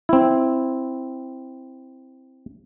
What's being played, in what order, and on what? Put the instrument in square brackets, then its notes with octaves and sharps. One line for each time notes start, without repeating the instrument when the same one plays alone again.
[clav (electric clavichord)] C4 E4